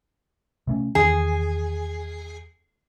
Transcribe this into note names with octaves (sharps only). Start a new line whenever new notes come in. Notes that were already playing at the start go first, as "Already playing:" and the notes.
C3 A3 C#4
E2 D#3 E3 G#4